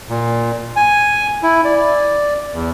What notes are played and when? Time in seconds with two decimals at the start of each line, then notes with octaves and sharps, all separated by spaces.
0.09 A#2
0.76 G#5
1.43 E4
1.65 D5
2.54 E2